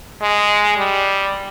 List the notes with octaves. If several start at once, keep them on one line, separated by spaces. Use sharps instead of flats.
G#3
G3